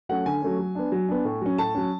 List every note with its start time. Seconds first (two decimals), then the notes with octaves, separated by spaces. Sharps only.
0.09 F#3 A3 C#4 F#5
0.26 D3 G#5
0.42 F#3 A3 C#4
0.59 F#3
0.75 B3 D4
0.92 F#3
1.09 B3 D4
1.25 A2
1.41 F#3 C#4
1.58 A2 A5
1.75 F#3 C#4